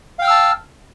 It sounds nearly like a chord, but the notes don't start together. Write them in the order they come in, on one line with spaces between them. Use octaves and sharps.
F5 G5 F6 E6 A5